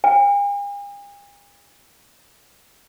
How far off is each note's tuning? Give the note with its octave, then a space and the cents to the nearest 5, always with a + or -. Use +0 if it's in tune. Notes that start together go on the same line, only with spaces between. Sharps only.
G#5 -45